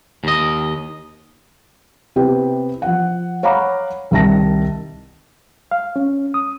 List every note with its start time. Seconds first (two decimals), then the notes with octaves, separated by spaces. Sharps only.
0.24 D#2 D#5
2.16 C3 B3 E4 G4
2.82 F3 F#5
3.43 C#5 F5 F#5 A#5 B5 D6
4.11 C2 D#3 E5 A5 A#6
5.71 F5
5.96 C#4
6.34 D#6